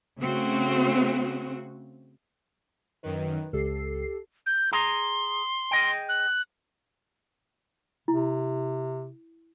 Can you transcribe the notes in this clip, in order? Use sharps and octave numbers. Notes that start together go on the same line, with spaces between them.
C#3 A3 C4 F#4
F#2 D#3 B4
C#2 G4 A4 C7
G6
G#4 A#5 C6
G#4 D#5 G5
F#6
C3 E4